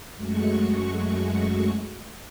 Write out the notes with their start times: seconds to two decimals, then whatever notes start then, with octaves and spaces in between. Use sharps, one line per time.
0.15 F#2 G#3 A3 F#4 C#6